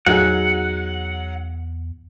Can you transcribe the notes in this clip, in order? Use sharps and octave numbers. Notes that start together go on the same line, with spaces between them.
E2 F#3 D#4 G#4 F#5